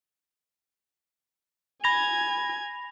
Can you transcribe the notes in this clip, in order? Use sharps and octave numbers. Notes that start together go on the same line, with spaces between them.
G#5 B5 G#6 A#6 F7